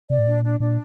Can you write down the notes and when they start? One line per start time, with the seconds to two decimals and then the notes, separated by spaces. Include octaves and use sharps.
0.09 C3 D5
0.19 A2
0.26 A#2 D4
0.43 D4
0.60 A#2 D4